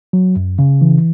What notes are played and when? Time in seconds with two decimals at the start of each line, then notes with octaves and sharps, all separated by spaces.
0.13 F#3
0.36 F#2
0.59 C#3
0.81 E3